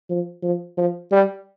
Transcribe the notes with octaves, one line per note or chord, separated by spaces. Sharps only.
F3
F3
F3
G3